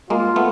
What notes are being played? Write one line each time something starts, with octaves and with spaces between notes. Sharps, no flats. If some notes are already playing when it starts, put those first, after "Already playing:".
G#3 A#3 F4
A3 B3